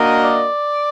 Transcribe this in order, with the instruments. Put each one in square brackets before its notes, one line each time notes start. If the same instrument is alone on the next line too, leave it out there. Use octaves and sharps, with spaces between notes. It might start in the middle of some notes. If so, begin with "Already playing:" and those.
Already playing: [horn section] A#3 D4 F#4 A#4 D#5
[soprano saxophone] D5